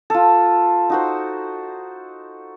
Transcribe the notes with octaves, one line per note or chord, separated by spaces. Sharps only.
F4 A4
D#4 F#4 C5